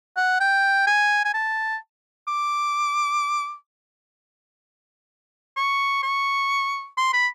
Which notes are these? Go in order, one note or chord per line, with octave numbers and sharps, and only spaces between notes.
F#5
G5
G#5
G#5
A5
D6
C#6
C#6
C6
B5